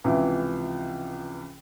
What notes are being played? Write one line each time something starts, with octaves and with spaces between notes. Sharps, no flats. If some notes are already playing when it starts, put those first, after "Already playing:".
C#2 C3 E3 F3 E4